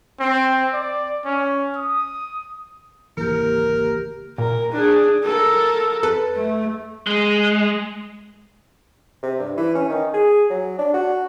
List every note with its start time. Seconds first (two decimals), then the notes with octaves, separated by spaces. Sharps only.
0.20 C4
0.73 D5
1.25 C#4
1.75 D#6
3.17 G#1 C#2 E3 A#3 G4 A#4
4.38 A#2 A#4
4.72 D4 G#4
5.24 A4 A#4
6.03 F2 A4 B4
6.35 A3
7.07 G#3
9.23 C3
9.39 G2
9.57 E3
9.75 C#4
9.89 D#3
10.14 G#4
10.50 F#3
10.78 D4
10.94 F#4